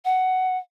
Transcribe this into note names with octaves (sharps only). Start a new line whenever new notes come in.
F#5